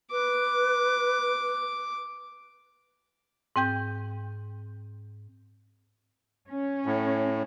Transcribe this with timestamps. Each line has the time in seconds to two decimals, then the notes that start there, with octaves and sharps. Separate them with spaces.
0.12 B4 D6
3.56 G#2 C4 G5 G6
6.49 C#4
6.86 A2